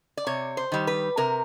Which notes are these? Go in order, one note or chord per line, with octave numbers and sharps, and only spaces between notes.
D5
C3 C#5
C5
D#3 G3
B4
C3 A#4